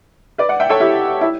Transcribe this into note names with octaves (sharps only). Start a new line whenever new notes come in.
B4 D5
D5 F#5
E5 G5
A4 C#5
E4 G4
E4